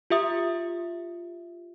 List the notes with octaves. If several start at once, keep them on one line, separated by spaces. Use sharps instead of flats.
F4 G4 E5 D#6